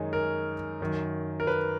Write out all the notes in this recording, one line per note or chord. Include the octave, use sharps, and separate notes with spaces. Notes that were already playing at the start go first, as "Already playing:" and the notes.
Already playing: F#2 D#3 G#3 D#4
A#4
F#2 D#3 F#3
A#4
B4